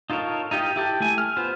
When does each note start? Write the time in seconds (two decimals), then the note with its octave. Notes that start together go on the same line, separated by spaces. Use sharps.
0.10 D#4 F4 A4 A#4 C#5
0.51 D#4 F4 G4 D#5
0.76 E4 G4 A4
1.00 A3 E4 G#5
1.18 F6
1.37 B3 F4 C5